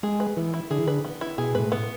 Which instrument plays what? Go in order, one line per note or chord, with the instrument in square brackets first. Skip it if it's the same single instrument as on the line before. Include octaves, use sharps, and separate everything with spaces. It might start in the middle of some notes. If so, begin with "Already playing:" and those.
[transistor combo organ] G#3 [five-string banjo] G#4
[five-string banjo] B4
[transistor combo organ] E3 [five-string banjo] B3
[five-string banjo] E4
[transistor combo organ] D3 [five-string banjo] G#4
[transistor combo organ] E3
[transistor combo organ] D3 [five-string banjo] B4
[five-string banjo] B3
E4
[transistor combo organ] B2 [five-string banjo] G#4
[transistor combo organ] G#2 [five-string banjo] B4
[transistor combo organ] A2
[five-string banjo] B3